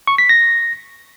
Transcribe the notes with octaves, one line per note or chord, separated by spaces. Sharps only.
C#6
B6
A#6